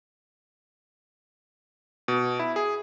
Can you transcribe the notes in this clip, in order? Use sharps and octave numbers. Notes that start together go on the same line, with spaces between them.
B2
E4
G#4